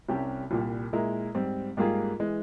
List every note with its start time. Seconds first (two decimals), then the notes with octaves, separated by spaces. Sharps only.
0.08 C2 C3 G3 C#4 G4
0.51 C2 A#2 G3
0.93 A#2 G#3 E4 A#4
1.35 G#2 G3 C4
1.77 G#2 G3 A#3 F4 G#4
2.20 E3 G#3